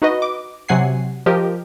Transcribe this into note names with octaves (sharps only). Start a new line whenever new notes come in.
D#4 F#4 B4 D#5
D6
C3 F#3 F#5 G#5 C7
F3 G4 A#4 D#5